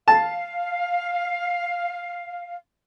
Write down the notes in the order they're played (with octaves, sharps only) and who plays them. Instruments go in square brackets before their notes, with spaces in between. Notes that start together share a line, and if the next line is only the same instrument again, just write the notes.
[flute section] F5 [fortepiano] A5